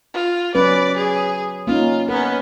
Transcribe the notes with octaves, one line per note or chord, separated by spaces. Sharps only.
F4
F#3 C#4 B4 D5
G#4
A#3 C#4 D#4 F4
B3 C#4 A#4